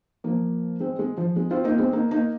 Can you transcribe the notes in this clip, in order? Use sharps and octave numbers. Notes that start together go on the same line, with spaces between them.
F3 A#3
G#3 C4
G#3
F3
G#3
C4 F4
A#3 D#4
G#3 C4
A#3 D#4
A#3 D#4